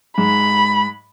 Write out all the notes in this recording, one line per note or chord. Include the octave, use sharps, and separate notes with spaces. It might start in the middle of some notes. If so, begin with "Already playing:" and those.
G#2 B5